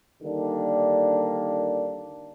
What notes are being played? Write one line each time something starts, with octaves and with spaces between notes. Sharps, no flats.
D3 D#3 G3 A#3 D4